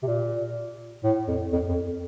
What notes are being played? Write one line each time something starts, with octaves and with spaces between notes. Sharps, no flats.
C3
A#2
A2
F2
F2
F2